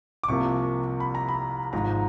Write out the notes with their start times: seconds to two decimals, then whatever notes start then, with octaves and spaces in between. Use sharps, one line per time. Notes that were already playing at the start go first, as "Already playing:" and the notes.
0.24 D6
0.28 C2 C3 F3 A#3 C#6
1.00 B5
1.15 A#5
1.28 B5
1.73 G#1 G#2 F3 A#5